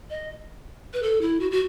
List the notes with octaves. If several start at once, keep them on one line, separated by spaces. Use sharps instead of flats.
D#5
B4
A4
E4
F#4
F#4